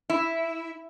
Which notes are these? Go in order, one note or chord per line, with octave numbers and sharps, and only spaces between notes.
E4